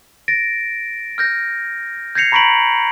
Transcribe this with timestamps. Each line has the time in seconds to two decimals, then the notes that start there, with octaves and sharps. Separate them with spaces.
0.28 A6 A#6 D7
1.18 F6 G6 A#6
2.15 G6 G#6 A#6 C7 C#7 F7
2.32 A#5 B5 C#6 B6 D7 F#7